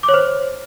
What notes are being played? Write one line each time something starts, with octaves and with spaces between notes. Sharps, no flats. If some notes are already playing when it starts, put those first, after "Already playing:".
D6
C#5
C5